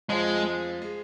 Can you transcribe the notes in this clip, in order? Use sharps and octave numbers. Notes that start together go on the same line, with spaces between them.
F2 F3 G#3
G#3